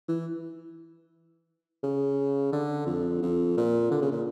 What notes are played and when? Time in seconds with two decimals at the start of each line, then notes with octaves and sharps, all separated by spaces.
0.08 E3
1.83 C#3
2.53 D3
2.87 F2
3.22 F2
3.57 A#2
3.91 D3
4.02 C#3
4.12 A#2